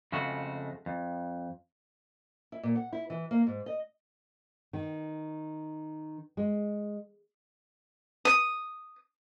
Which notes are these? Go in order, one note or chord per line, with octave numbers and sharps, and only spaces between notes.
F2 C#3 G#3 A3 F#4
F2
E4
A#2
F#5
E4
E3
A#3
G#2
D#5
D#3
G#3
D#6